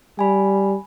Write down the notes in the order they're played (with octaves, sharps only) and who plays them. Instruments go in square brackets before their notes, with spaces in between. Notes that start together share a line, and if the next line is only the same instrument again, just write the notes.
[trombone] G3 [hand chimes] G#5 B5